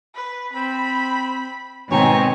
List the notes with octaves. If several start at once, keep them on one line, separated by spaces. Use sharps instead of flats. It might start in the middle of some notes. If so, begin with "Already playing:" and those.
B4
C4 B5
G#1 B2 D#3 C4 C#5 G5 G#5 A#5